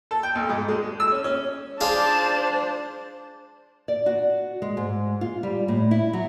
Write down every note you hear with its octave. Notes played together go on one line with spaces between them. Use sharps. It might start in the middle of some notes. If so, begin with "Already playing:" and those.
A4
G5
B1
G#2
G#3
G#3
E6
C#4
C#4
D4 F4 G#4 C5 D5 A5
D5
F#4
G#3
G#2
F4
G3
A2
E4
F#3